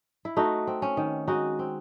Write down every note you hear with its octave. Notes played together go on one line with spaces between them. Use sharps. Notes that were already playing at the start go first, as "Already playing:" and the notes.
E4
A3 D#4 F#4
C4
C#4
D#3
G#3 D#4 F#4
C4